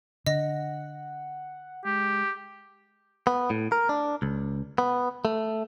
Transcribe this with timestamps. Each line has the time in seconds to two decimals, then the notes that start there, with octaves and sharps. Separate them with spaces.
0.27 D3 D#5 F#5 A#6
1.85 G#3 G4
3.27 B3
3.50 A2
3.72 A#4
3.89 D4
4.22 C#2
4.78 B3
5.25 A3